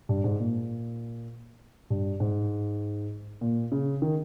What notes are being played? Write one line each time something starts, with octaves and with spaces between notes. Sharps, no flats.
G2
G#2
A#2
G2
G#2
A#2
C#3
D#3